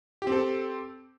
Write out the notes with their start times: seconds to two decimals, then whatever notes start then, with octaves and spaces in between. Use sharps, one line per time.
0.22 G4
0.27 C4
0.32 A4